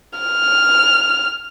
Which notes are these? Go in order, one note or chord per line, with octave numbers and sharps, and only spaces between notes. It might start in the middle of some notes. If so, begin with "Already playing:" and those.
F6